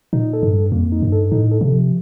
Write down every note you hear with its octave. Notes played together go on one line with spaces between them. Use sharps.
A#2 D#4
A4
G2
G3
F2 A#3
D#4
G2
A4
A2 D#4
A4
C3
F3